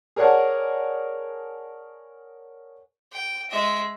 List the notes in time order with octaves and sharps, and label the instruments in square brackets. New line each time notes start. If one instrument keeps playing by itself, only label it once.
[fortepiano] G#4 A#4 C#5 D5 F#5 A5
[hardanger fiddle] G5
G#3 E5